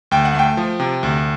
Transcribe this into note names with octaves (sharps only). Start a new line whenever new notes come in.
D2 G5
F#5
A3 G5
F3
C3
D2